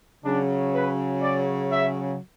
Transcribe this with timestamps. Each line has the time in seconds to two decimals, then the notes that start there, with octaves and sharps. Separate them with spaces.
0.25 C#3 F#3 D4
0.74 B4
1.22 D5
1.72 E5